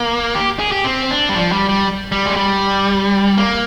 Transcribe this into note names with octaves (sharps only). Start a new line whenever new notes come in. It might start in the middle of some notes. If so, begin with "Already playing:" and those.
Already playing: A#3
G4
G#4
G4
C4
D4
G3
F3
G3
G3
G3
G#3
G3
A#3